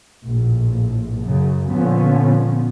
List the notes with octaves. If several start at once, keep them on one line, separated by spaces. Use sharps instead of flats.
A#1 A2
F#2 C#3
A#2 D3 F3 B3 C#4